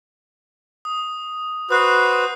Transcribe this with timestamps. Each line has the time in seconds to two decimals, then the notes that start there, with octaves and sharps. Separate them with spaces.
0.85 D#6
1.71 F#4 B4 C5 D#6 F#6 C7
2.13 D#6